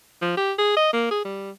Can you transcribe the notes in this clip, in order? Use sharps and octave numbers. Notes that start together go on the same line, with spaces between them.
F3
G4
G#4
D#5
A#3
G#4
G3